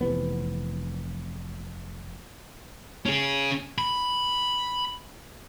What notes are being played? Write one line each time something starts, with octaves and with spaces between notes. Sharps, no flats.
F1 C3 E3 B3
C#4 G#4
B5